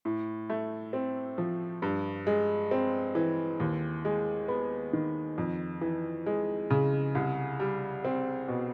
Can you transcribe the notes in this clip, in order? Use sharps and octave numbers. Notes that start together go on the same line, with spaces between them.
A2
A3
C4
F3
G2
G#3
C4
E3
D#2
G#3
B3
D#3
F2
E3
G#3
C#3
C2
G3
C4
B2